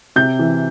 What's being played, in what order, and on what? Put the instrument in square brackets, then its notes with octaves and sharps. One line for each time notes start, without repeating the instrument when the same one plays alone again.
[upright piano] C3 G6
E3